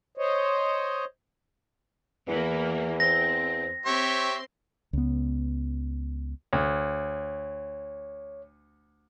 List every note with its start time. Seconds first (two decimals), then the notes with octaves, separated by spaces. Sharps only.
0.17 C5 C#5 D#5
2.28 E2 E3 A#3
3.00 C4 A#6
3.86 C4 G4 C#5 E5 C6
4.93 C#2 B3
6.53 D2 C#5